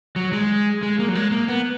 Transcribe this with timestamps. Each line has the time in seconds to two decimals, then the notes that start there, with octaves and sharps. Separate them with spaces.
0.16 F#3
0.33 G#3
0.83 G#3
0.99 A#3
1.08 F#3
1.15 G#3
1.32 A#3
1.48 B3